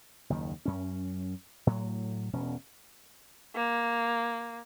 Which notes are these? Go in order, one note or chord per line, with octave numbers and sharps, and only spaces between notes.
F#1 D#2 D#3
F#2 C#4
A2 F#3
E1 B2 C#4
A#3